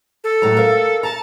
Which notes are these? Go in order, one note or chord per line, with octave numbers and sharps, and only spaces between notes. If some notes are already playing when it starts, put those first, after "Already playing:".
A4
A2 F#3 A#5
A#4 F5
A5 A#5